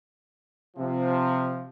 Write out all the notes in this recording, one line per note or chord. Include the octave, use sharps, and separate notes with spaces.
C3 F3